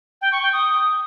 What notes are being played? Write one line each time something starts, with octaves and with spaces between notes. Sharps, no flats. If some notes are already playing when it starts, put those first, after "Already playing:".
G5
C#6
G5
D#6